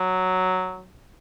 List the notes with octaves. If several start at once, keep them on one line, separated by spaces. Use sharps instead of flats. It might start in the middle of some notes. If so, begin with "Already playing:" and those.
Already playing: F#3